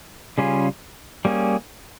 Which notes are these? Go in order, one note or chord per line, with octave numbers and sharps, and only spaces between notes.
C#3 G3 C#4 F4 G#4
G3 A#3 C#4 G#4